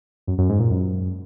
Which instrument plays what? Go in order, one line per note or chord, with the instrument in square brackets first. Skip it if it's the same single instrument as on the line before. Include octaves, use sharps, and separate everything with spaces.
[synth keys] F#2
F#2
G#2
A#2
F#2